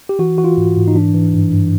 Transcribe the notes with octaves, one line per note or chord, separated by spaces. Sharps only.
G4
E3 F#4
E3 F#4
F4
G#2
G#2
D#4
E3 D4
E3
G2
G2